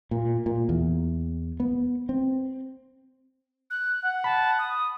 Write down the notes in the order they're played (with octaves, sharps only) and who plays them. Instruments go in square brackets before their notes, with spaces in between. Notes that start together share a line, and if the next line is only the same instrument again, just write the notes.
[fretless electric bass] A#2
A#2
E2
B3
C4
[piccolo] F#6
[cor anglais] F#5
[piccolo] A5 [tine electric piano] B5
[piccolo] D#6